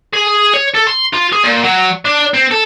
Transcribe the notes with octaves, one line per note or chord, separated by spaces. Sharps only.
G#4
C#5
A4
C6
F4
G#4
A#2
F#3
D4
C4
A4